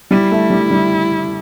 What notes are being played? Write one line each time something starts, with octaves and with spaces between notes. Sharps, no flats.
G3 E4
A3
G3
G3